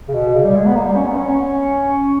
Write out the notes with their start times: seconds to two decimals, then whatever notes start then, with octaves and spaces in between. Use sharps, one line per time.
0.08 C#3
0.14 B2
0.34 C#3
0.44 G3
0.55 G#3
0.66 B3
0.76 A#3
0.85 G3
0.96 C#4
1.06 B3
1.17 C#4